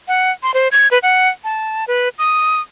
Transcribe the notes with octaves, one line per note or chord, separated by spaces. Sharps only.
F#5
C6
C5
G#6
B4
F#5
A5
B4
D#6